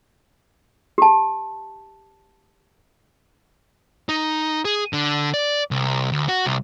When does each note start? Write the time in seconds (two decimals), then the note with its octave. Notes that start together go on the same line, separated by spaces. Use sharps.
0.98 G4 A5
4.09 D#4
4.65 G#4
4.93 D3
5.34 D5
5.71 C2
6.12 D2
6.29 F#4
6.46 C2